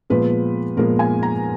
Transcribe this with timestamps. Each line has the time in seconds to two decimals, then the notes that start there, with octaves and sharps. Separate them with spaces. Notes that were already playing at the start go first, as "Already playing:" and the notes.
0.10 A#2 F3 G#3 B3 B4
0.77 A#2 F3 G#3 B3 A#4
0.99 G#5
1.23 A#5